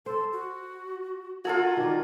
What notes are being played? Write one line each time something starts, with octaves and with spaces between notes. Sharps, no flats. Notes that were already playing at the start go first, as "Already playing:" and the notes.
A4 C5
F#4
F4 F#4 A4 A#4 G#5
D#3 D4